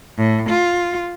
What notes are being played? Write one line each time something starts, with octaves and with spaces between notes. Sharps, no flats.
A2
F4